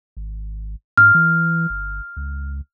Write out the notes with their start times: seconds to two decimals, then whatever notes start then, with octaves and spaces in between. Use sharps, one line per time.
0.17 G#1
0.97 G#2 F6
1.15 E3
1.70 G1
2.17 C#2